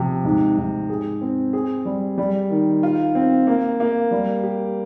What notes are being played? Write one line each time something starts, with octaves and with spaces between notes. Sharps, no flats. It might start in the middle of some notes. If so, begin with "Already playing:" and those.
Already playing: C3 F3
G#2
G#2
G#4
C4
G#4
G3
G3
D#3
F4
C4
A#3
A#3
G3
G4